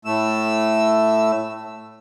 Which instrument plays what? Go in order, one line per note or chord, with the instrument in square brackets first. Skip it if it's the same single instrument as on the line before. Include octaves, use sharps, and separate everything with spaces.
[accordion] A2 A3 E6